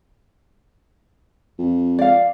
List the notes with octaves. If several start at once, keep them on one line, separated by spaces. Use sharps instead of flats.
F2
D5 F5